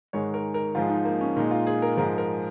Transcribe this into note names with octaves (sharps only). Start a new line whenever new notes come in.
G#2 D#3 G#3 C#5
A#4
A#4
G#2 F3 G#3 F4
D#4
A#3
C#4
A#2 G#3 D#4
F4
G#4
A#4
G#2 F3 G#3 A#4
A#4